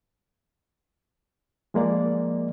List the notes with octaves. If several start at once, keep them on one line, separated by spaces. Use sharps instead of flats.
F3 G#3 A#3 D5